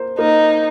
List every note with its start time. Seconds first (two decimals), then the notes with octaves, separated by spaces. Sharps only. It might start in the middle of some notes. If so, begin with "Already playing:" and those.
Already playing: A#3 C5
0.19 A#3 D#4